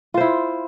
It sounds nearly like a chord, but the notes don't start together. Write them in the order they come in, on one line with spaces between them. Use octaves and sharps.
F4 C5 E4